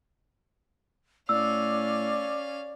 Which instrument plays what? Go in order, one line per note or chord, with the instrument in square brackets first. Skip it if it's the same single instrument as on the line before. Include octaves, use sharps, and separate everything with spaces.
[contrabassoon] A2 [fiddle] C#4 F5 [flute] D5 [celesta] E6